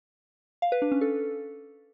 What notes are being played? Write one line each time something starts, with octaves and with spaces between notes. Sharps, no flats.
F5
B4
D4
C#4
A4